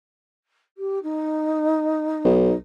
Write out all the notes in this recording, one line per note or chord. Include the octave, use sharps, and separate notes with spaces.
G4
D#4
B1